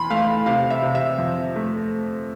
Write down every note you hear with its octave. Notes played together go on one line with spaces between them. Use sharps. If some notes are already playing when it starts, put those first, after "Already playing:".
Already playing: E2 B5 C6
A3 F5
C3 F5
E5
C3
E5
F2
A3